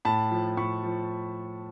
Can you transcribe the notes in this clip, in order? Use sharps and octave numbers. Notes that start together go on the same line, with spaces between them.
A2 A5 B5
F3
A2 B5 C#6
F3